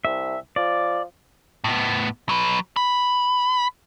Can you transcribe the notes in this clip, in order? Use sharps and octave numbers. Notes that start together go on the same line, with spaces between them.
C2 E5
F3 D5
A2 B3
F#3 B4
B5